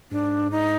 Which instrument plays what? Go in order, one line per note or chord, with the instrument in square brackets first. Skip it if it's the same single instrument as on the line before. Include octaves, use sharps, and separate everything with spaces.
[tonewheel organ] G#2 [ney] D4
[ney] D#4